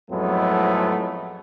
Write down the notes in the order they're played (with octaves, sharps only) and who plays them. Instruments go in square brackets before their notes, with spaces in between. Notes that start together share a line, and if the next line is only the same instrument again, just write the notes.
[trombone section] F2 A2 F#3 G#3 A3 B3